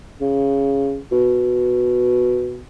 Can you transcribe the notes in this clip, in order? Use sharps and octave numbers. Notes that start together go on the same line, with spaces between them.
C#3
B2